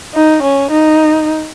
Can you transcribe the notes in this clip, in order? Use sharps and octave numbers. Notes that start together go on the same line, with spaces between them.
D#4
C#4
D#4